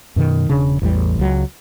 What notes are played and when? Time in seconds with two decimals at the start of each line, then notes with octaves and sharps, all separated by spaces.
0.16 F#2 B2 D#3
0.49 E1 C#3 D4
0.82 A1 E2 E3 G3
1.19 C#2 F#3